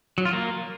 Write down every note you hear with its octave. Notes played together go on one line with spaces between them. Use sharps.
F#3
F4
A#3